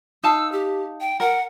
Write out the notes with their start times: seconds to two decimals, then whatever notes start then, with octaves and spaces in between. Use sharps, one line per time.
0.23 D#4 F5 A5 E6
0.52 G4
1.01 G5
1.20 A#4 F#5